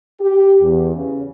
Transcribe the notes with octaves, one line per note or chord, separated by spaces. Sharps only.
G4
E2
C#3